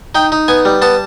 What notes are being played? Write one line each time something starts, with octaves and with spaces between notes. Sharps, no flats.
D#4 G5
D#4
B3 G#5
G3
B3 A5